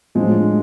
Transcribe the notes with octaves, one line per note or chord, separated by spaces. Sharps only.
A2 F3 F#3 G#3 A3 D4